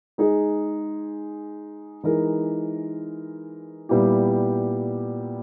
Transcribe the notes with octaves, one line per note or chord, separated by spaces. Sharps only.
G#3 D#4 G#4
E3 G#3 D#4 A#4
A#2 G3 B3 E4 G4